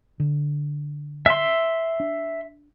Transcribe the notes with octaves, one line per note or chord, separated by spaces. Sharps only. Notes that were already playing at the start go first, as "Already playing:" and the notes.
D3
E5 C6
D4